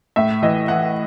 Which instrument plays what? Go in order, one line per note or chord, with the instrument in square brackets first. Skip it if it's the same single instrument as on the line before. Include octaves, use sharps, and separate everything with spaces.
[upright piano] A2 E5
E3 D#5
E3 F#5